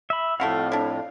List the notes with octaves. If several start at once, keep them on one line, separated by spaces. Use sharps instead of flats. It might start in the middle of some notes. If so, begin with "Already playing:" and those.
E5 B5
F2 A2 A3 E4 F#4 F5
D4 E4